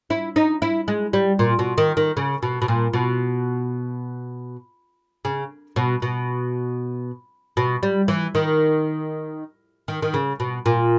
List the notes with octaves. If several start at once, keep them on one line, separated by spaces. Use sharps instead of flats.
E4
D#4
E4
G#3
G3
A#2
B2
D#3
D#3
C#3
B2
B2
A#2
B2
C#3
B2
B2
B2
G3
E3
D#3
D#3
D#3
C#3
B2
A#2